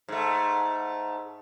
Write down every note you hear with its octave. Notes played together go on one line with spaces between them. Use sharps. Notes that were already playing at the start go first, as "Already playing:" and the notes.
G#2 A3